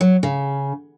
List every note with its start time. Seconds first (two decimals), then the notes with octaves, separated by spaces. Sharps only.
0.01 F#3
0.23 C#3